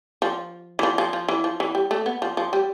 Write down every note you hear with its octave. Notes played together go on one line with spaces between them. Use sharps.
F3
E3
F3
F3
F3
E3
F3
E3
G3
A3
B3
F3
F3
G3